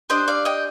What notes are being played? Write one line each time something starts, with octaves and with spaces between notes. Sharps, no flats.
D4 G4 C5 D#5
D5 F5
D#5 G5